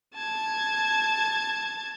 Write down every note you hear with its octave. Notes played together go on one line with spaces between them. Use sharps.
A5 G#6